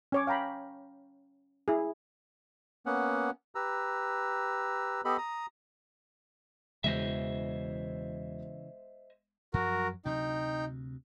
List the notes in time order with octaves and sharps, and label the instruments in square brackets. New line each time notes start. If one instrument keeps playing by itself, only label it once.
[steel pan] C#4 C#5 D6
F5 G5 A#5 B5
E4 G#4
[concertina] A#3 B3 C#4 F#5
G4 B4 A#5 E6
B3 G4 A4 D#5 B5
A#5 D#6
[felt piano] E1 [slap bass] C#3 E3 [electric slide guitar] C5 D#5 E5
[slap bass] F#2 F3 F#3 [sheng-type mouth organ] F#4 A#4
[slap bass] D2 C3 F#3 [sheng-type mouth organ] D#4 G5